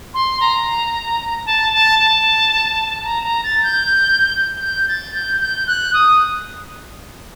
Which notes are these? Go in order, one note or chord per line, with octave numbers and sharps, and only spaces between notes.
C6
A#5
A5
A5
A5
A#5
A#5
A6
G6
G6
A6
G6
G6
F#6
D#6